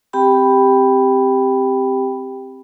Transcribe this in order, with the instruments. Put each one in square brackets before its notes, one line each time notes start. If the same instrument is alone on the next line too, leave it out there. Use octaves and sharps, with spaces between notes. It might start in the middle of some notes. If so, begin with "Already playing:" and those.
[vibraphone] C4 G4 G5 B5